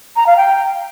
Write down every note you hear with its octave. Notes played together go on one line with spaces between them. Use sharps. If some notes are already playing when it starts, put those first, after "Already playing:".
A#5
F5
G5